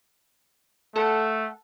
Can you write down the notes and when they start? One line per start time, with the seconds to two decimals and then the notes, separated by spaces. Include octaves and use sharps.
0.96 A3 A4 F#5